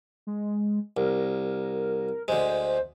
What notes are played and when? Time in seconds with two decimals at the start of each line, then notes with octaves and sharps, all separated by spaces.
0.27 G#3
0.97 C2 A#4
2.28 D2 G#3 C5